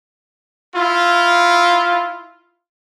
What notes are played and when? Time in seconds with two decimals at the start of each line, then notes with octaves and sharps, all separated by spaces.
0.74 E4 F4